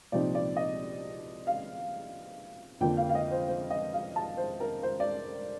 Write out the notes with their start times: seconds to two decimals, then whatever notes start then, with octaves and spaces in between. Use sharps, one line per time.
0.12 C2 A#2 F3 C4 D#4 D5
0.35 D5
0.57 D#5
1.47 F5
2.80 F2 D3 F3 A#3 D4 G5
2.97 F5
3.09 F5
3.15 D#5
3.31 C5
3.48 C5
3.70 D#5
3.93 F5
4.16 A5
4.37 C5
4.60 A#4
4.83 C5
5.00 D5